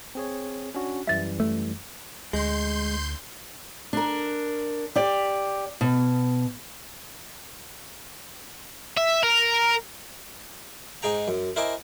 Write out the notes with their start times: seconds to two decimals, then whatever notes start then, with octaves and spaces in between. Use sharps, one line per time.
0.15 C4 G#4 C#5
0.75 C#4 D4 F#4
1.07 F#2 E3 G3 E5 A6
1.40 A3
2.33 D2 G#3 C6 G6
3.93 D4 A#4
4.95 G4 D5
5.81 B2
8.97 E5
9.23 A#4
11.02 G#2 D#4 G#4 G5 A#5
11.28 F#2
11.56 E4 A#4 C5 D#5 G#5 D6